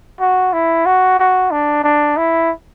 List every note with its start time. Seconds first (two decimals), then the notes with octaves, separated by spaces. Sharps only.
0.20 F#4
0.53 E4
0.86 F#4
1.19 F#4
1.51 D4
1.84 D4
2.17 E4